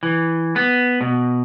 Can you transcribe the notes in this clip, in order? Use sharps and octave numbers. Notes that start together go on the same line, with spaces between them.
E3
B3
B2